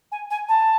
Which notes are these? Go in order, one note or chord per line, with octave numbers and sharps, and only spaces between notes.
G#5
G#5
A5